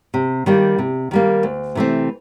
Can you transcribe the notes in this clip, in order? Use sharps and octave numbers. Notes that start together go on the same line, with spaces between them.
C3
D#3 G3 A#3
C3
D#3 G3 A#3
D2
C3 E3 A3 C4